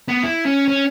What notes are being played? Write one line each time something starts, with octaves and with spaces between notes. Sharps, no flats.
B3
E4
C#4
C#4